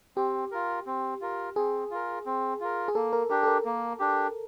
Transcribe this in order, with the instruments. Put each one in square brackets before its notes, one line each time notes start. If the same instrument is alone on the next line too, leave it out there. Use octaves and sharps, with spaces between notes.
[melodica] C4 [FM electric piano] G4
[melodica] F4 A#4
C4
F4 A#4
[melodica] C4 [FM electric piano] G#4
[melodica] F4 A#4
C4
F4 A#4
[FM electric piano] G#4
[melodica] A#3 [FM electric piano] A4
[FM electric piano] A#4
[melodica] D4 G4 [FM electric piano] A#4
[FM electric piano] A4
A#4
[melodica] A#3
D4 G4